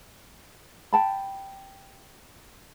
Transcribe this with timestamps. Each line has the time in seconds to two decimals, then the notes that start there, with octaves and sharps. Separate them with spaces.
0.93 G5 A5 B5